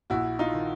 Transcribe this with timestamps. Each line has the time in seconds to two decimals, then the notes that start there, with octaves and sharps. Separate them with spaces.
0.10 A#1 E4 F#4
0.39 D#4 F4
0.54 D#3